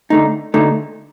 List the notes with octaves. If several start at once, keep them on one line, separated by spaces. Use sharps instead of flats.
D3 A3 D#4
D3 A3 D#4